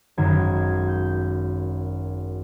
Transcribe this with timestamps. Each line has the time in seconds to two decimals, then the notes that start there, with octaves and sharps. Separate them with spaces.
0.17 G#1 F#2 D#3 G#6
0.53 G#6
0.88 G6